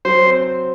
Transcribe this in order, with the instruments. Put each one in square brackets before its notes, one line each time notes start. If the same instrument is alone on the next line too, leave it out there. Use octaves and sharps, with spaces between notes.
[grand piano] F#3 [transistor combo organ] C5
[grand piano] C4